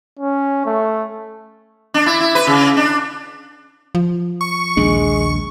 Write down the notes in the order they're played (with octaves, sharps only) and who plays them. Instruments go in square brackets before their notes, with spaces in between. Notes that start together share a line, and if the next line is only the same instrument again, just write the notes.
[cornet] C#4
A3
[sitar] D4
E4
E4
B4
C#3
D4
[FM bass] F3
[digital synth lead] C#6
[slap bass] A#1 D#2 D4 [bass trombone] G#3